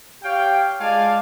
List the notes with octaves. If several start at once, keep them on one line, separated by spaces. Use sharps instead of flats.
G4 C#5 F5 G5
G#3 F4 D5 F5 G#5 A5